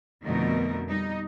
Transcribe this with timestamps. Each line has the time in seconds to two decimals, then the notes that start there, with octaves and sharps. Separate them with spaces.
0.23 F2 B2 D3 A3 D#4 A#4
0.88 G3 D#4